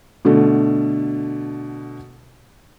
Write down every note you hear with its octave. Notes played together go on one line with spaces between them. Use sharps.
B2 D3 A3